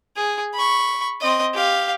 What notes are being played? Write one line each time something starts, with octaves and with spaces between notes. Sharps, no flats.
G#4
B5 C#6
C4 D#5
G4 F5